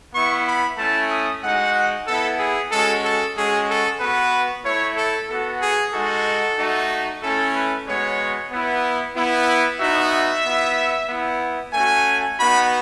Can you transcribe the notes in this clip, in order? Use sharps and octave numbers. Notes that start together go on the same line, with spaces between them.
B3 E4 C#6
B5
A3 C#4 E4 A5
D#6
G#3 D#4 F#4 F#5
B3 E4 A4
G#4
G#3 C#4 F#4 A4
A4
G#3 C#4 F#4 G#4
A4
B3 F#4 B4
A3 E4 C#5
A4
B3 F#4 A4
G#4
G#3 D#4 F#4 A4
A3 D#4 F#4
A3 C#4 E4 A4
B4
G#3 B3 F#4 C#5
B3 E4
B3 E4
B3 D#4 F#4 E5
B3 E4
B3 E4
A3 C#4 F#4 G#5
B3 D#4 F#4 B5